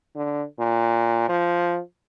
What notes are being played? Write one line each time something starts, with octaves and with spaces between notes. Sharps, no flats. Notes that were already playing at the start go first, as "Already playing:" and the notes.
D3
A#2
F3